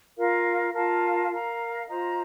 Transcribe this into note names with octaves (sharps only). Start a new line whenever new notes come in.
F4 A#4 F5
F4 A#4 F5 A5
A#4 F5 A#5
F4 C5 D#5 A#5